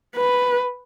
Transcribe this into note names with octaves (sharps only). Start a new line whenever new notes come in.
B4